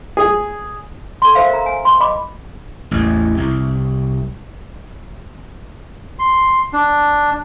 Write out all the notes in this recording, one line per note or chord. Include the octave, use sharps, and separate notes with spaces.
G#4
A4 C6
A#4 C5 E5 F5
A#4 A#5
G#5
C6
D#5 B5 D6
A1 E2
C2
C6
D4